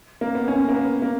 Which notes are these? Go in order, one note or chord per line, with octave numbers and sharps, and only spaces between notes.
A#3
B3
C#4
A#3
B3
A#3